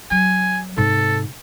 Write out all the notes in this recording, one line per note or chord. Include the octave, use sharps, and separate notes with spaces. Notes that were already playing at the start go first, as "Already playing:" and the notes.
F#3 G#5
G#2 C3 A4